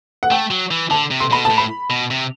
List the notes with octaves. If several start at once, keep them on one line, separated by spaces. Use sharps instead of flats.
F#5
A3 G5
F#3
E3
D3 A5
C3
C6
B2 B5
A5
A2
B5
B2
C3